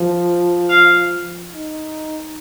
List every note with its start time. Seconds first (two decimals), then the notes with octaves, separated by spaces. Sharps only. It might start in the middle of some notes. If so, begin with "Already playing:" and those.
Already playing: F3
0.70 F5
1.52 D#4